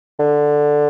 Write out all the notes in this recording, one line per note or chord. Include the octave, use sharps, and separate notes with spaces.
D3